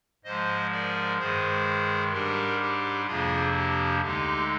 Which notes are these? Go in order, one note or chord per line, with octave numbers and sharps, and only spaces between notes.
G#2 F3 G#3 C5 D#5
A#4 D5
G2 D#3 G#3 G#4 C5
G#2 G3 D4 G4 A#4
G4
F2 C3 F3 A#3 D4 F4 G#4
G4
D2 D3 G#3 D#4 G4